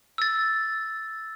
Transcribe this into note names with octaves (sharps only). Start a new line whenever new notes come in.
E6 A6